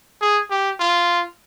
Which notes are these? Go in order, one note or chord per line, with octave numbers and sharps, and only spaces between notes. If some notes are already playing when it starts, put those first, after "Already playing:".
G#4
G4
F4